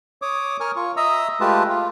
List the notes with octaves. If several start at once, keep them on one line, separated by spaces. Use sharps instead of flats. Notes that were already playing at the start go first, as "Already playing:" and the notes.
C#5 D6 D#6
A#4 G#5 C#6 F6
F4 C#6
D#5 E5 A#5 D#6 E6
G#3 A3 F4 G4 B4 A5
F4